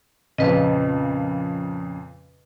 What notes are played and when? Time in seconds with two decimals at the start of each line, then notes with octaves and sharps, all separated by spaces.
0.38 F2 A#2 C#3 B4 D#5